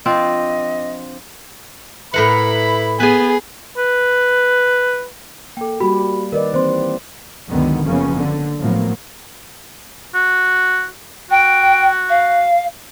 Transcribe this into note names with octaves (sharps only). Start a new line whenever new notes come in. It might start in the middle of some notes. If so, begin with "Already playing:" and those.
F3 C4 D4 D#5
A2 E4 A#4 B4 F#5 B5
B3 G#4 B4 G#5
B4
A#3 A4 G5
G3 A#3 F#4 G4 B5
D#3 A#4 B4 D5 D#5
E3 A#3 C4 C5 C6
C#2 F#2 D3 D#3 B3
F#1 C#3 F3 A#3 B3 C#4
D3
A2 F3 F#3 A#3 B3
F#4
F#4 G5
F5